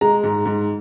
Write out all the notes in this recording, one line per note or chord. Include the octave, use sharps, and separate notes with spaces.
G#3 A#5
G#2
G#2